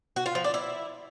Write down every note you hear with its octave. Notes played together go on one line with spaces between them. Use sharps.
F#4
F4
F3
D4
E4